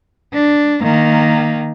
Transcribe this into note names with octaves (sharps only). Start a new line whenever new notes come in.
D4
D#3 A#3